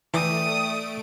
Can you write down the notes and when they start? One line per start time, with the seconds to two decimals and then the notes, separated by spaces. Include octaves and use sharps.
0.14 E3 A3 D5 E5 G5 D#6 D7